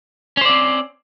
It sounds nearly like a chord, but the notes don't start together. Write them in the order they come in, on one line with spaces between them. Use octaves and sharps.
C#4 C5 D5 C4